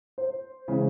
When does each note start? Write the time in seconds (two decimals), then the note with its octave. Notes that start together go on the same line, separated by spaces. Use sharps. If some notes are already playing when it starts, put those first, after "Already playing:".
0.18 C5
0.68 C#3 E3 G#3